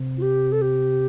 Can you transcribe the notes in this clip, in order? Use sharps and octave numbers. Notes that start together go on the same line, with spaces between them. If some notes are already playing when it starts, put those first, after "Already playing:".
Already playing: C3
F4
G4
A4
G4